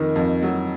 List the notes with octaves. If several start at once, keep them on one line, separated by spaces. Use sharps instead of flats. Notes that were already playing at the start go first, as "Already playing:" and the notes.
Already playing: F2 D#3
F2
F#3